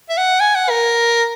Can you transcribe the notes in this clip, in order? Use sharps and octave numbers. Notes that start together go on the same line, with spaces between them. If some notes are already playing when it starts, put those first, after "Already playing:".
E5
F#5
G#5
F#5
A#4